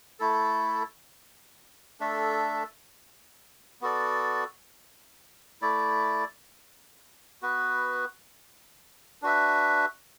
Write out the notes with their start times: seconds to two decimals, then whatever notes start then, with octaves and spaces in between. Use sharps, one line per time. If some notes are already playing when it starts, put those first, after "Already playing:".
0.20 A3 E4 A4
2.00 A3 D4 A4 E5
3.81 B3 F#4 A4 D5
5.61 A3 E4 D5
7.42 B3 F#4 B4
9.22 D4 F#4 B4 E5